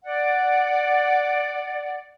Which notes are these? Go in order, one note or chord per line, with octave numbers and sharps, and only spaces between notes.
D5 F#5